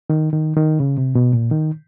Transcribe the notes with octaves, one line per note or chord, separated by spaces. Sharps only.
D#3
D#3
D#3
C#3
C3
B2
A#2
D#3